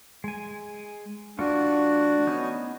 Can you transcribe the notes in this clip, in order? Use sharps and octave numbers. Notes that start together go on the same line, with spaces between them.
G#3 G#5
E3 A3 D4 F4 F#4
B3 C#4 D#4